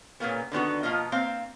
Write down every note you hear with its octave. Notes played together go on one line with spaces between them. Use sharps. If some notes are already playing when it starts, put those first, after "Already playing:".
A#2 C#3 A#3 B3
D3 D#3 B3 F#4
B2 F3 A#3 F4 D#5
A#3 C4 F5